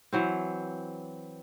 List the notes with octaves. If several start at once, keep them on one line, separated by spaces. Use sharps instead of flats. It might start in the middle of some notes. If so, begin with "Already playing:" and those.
E3 F#3 C4